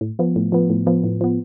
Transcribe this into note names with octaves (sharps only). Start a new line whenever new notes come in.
A2
F3 B3
A2
F3 B3
A2
F3 B3
A2
F3 B3